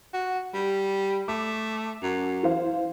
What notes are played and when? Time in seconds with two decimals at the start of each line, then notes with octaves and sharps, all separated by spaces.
0.13 F#4
0.54 G3
1.28 A3 D6
2.02 F#2
2.43 E3 C5 F5